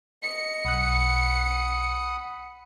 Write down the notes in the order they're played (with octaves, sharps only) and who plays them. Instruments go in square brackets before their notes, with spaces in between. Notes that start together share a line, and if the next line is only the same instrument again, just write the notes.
[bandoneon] D#5 [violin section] C#7
[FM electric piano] B1 F#6 [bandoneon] F#5 B5 D#6